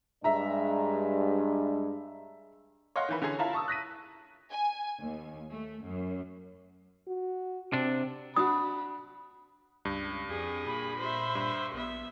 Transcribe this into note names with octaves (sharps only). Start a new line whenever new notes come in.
G2 G#3 D4 E5 A#5
C#5 D#5 F5 F#5 C6
D#3 E3 B4
D3 E3 C#4 G#4
E4 F4 A5 A#5
A5 C#6 D#6 E6
F#6 A#6 B6 D#7
G#5
D#2
A3
F#2
F#4
C3 C4 D4
D4 F#4 B5 D#6
C#2 G2
F2 G4 G#4
A#2 B5
C5 E5
G2
A#1 B3 E5